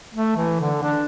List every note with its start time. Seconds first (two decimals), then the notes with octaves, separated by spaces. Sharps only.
0.15 A3
0.37 E3
0.60 D3
0.83 D4